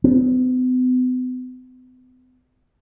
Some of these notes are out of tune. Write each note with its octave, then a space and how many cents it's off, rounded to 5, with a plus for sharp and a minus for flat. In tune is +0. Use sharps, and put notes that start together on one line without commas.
B3 +45